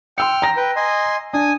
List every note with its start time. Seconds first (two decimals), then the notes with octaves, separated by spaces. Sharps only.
0.18 G5 C6 E6 F6 C#7
0.42 A#5 A#6
0.57 B4 G5
0.76 D#5 G#5 C6
1.33 D4 G#5 D#6